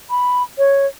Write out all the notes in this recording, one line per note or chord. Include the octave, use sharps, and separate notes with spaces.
B5
C#5